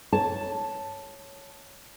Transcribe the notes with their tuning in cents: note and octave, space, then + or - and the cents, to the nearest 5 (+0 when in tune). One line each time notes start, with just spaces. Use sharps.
C#5 +0 A5 +0